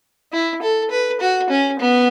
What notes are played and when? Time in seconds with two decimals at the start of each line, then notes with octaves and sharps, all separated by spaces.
0.33 E4
0.62 A4
0.91 B4
1.21 F#4
1.50 C#4
1.80 B3